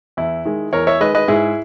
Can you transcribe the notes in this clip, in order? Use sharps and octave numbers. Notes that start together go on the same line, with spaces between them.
E2 E4
D#3 G#3
E2 A#4 C#5
C#5 E5
D#3 G#3 B4 D#5
B4 D#5
G#2 E4 G#4